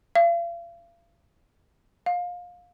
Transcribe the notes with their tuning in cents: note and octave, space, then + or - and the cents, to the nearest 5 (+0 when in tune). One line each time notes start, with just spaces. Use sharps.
F5 -40
F5 +25